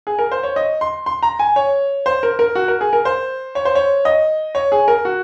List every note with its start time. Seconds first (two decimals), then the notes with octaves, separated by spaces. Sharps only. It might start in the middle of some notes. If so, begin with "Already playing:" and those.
0.07 G#4
0.19 A#4
0.31 C5
0.43 C#5
0.56 D#5
0.81 C6
1.06 C6
1.23 A#5
1.39 G#5
1.56 C#5
2.06 C5
2.23 A#4
2.39 A#4
2.55 F#4
2.68 A#4
2.81 G#4
2.93 A#4
3.05 C5
3.55 C#5
3.65 C5
3.75 C#5
4.05 D#5
4.55 C#5
4.72 G#4
4.88 A#4
5.05 F#4